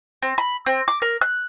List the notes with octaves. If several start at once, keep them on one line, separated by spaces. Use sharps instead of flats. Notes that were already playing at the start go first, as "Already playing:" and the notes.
C4
B5
C4
D6
A#4
F#6